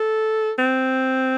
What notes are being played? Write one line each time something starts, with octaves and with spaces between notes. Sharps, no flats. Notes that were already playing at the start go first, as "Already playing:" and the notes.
Already playing: A4
C4